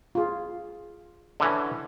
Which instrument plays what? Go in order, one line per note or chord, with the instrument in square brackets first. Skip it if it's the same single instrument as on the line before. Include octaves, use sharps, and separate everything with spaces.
[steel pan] F4 G#4
[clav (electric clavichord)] D3 E3 C#4